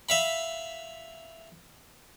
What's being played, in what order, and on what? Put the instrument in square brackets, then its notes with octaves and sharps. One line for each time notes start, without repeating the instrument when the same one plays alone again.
[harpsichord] E5 F5 B5